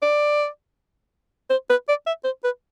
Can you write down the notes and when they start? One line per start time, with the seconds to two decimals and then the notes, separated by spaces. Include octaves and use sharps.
0.02 D5
1.50 C5
1.70 B4
1.88 D5
2.07 E5
2.24 C5
2.44 B4